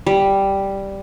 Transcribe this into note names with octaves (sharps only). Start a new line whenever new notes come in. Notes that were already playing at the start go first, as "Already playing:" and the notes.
G3